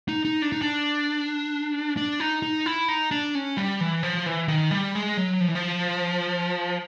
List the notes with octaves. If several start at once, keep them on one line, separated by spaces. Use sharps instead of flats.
D#4
D#4
D4
D#4
D4
D4
D#4
D#4
E4
D#4
D4
C#4
G3
E3
F3
E3
D#3
G3
G#3
F#3
F3
E3
F3